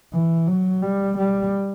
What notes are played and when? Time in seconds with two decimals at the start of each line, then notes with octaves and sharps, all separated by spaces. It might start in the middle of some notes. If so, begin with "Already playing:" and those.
0.13 E3
0.48 F#3
0.82 G3
1.17 G3